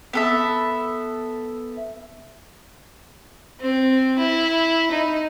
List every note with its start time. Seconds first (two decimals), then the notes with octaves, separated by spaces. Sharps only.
0.13 B3 A4 E5
3.61 C4
4.18 E4
4.91 D#4